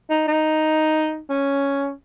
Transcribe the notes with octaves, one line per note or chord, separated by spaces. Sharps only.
D#4
D#4
C#4